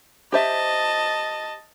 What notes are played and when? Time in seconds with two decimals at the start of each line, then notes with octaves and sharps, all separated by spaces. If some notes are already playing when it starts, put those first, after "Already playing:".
0.32 G4 C5 D#5 E5 A5